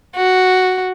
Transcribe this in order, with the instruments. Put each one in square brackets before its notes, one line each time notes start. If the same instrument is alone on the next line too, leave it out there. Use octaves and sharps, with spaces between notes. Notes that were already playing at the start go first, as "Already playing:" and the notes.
[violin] F#4